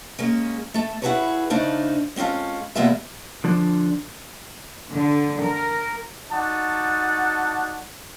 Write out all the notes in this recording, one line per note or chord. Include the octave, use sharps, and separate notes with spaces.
G#3 A#3 C#4
A3 A4
E4 F#4 G#4 A4 B4 C#5
C#3 A3 D4 D#4 F4 C5
G#3 C4 C#4 F4 A4
E2 B2 G#3 A#3 F4 E5
D3 F3 D4
D3
A#4
D#4 F#4 D5 F#5 A5